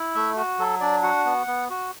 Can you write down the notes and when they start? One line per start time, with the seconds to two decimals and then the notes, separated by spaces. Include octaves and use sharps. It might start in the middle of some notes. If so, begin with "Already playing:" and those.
Already playing: E4
0.15 A3 E5
0.37 F#4
0.59 F#3 A4
0.80 D4 D5
1.03 F#4 F#5
1.26 B3
1.47 B3
1.70 F#4